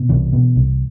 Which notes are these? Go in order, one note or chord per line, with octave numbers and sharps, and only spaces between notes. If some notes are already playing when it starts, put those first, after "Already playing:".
Already playing: B2
C2 E3
B2
C2